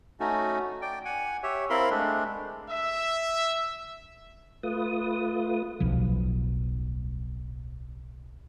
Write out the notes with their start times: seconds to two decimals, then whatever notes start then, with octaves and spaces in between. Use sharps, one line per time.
0.20 A3 C#4 D#4 F#4
0.82 D5 G5
1.05 F#5 G#5
1.43 G4 C#5 E5
1.70 C4 E4 A#4 F5 B5 C6
1.91 G#3 A3 D4
2.69 E5
4.63 A3 F4 B4 D#6
5.80 D1 B1 F3